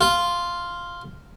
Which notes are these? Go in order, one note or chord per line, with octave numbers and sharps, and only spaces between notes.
F4